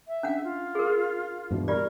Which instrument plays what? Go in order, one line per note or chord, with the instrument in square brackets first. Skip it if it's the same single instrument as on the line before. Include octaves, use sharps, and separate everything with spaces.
[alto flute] E5
[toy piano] C#4 D4 F#5
[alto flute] F4
[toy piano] G#4 A#4
[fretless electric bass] G2 B2 E3
[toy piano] F4 G4 D5 [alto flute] A#4